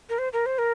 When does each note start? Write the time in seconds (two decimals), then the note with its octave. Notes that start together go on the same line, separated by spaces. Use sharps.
0.09 A#4
0.18 C5
0.33 A#4
0.46 C5
0.58 A#4